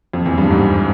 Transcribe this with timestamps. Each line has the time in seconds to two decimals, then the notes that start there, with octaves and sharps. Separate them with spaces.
0.13 F2
0.26 E2
0.38 G2
0.50 G#2